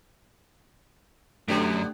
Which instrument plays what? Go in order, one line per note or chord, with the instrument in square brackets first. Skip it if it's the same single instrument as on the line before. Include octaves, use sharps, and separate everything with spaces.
[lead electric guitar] F#2 [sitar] B2 D3 [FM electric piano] A3 D4 G4